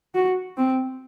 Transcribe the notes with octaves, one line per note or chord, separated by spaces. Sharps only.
F#4
C4